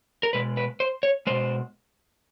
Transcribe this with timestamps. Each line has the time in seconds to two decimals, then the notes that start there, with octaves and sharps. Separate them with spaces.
0.23 A#4
0.33 B2 G#3 B4
0.57 B4
0.80 C5
1.03 C#5
1.27 B2 G#3 C5